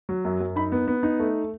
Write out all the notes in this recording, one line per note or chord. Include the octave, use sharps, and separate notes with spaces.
F#3
F#2
F#2
D#4 B5
B3
B3
D#4
A3